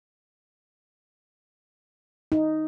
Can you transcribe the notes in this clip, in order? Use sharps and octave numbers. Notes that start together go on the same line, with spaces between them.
D#4